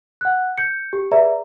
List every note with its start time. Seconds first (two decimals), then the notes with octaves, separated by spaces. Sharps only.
0.21 F#5 F#6
0.58 G6 C#7
0.93 G4
1.11 G#4 B4 D5 E5 A#5